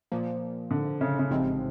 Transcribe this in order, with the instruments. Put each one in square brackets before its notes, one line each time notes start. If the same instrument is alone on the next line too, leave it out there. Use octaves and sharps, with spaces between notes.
[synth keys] A#2 F3 A#3
[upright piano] D3
C#3
C#3
[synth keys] A1 G#2 F3 G#3 C4 [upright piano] C3